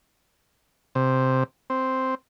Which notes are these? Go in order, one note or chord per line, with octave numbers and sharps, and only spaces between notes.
C3
C4